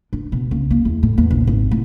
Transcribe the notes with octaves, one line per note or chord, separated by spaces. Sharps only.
D4
B2
C#2
A#3
E2
A2
E2
A#1
G#1
A2